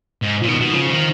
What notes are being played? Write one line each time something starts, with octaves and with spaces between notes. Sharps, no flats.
G#2
A#2 F3
B2 D#3
B2
C#3 F3
D#3